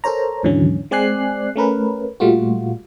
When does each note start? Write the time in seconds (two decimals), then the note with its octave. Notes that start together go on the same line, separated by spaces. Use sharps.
0.04 A4 A#4 C5 C#5 A#5
0.43 D#2 G#2 D3 E3 F#3 C#4
0.91 G#3 C4 D5 G#5 F#6 C7
1.56 A3 C#4 A#4 B4
2.20 A#2 G3 A3 F4 F#4